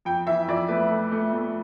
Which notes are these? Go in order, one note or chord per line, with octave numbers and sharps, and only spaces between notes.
F2 G5
E3 E5
F2 D5
A3 B4
A3
A3
A3